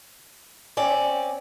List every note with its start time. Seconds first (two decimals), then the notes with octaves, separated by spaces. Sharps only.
0.77 C4 C#4 D5